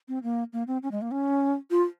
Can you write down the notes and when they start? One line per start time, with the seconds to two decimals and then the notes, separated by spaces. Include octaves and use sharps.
0.08 C4
0.23 A#3
0.53 A#3
0.67 C4
0.83 C#4
0.92 G#3
1.02 A#3
1.11 C#4
1.71 F4